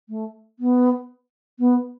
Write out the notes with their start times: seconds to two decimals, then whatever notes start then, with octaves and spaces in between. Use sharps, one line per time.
0.09 A3
0.59 B3
1.59 B3